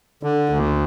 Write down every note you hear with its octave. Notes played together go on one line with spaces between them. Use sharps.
D3
D2